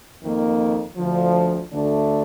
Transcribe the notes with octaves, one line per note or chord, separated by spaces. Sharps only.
F2 D#3 A#3
D2 D3 F3
D2 D3 A3 D4